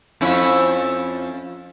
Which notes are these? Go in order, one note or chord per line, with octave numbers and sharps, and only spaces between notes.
F2 C#4 E4